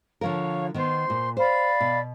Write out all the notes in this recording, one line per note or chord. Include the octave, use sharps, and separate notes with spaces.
D3 F3 A#4 C#5 F5
D#3 B3 C5 C6
A#2
C5 D5 F5 B5
B2